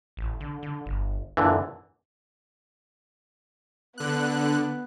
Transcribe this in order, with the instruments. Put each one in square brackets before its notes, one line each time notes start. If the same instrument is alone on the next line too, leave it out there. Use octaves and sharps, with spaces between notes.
[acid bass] A1
D3
D3
G1
[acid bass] F#2 [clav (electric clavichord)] A#2 D3 E3
[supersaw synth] D3 F#6 [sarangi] B3